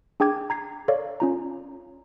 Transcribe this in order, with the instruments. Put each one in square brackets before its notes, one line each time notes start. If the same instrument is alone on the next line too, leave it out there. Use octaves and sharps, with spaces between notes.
[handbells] D4 G#4 G5 D6 G#6
A#5 G#6 C7
A4 C#5 D5 F5
C#4 F4 A#5